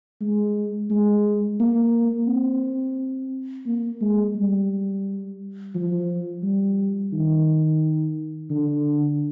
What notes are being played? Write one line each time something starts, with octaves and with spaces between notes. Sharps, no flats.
G#3
G#3
A#3
C4
A#3
G#3
G3
F3
G3
D#3
D3